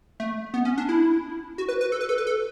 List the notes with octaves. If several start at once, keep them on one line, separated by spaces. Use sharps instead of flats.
A3
B3
C#4
D4
E4
F#4
B4
B4
A4
B4
A4
B4
A4